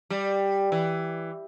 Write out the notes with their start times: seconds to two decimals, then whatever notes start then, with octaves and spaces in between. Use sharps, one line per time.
0.10 G3
0.72 E3